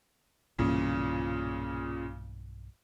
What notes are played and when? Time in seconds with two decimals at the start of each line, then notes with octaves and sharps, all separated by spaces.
0.59 B1 G2 A#2 C#3 E3